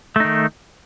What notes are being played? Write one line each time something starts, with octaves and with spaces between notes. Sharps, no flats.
D#3 A3 D#4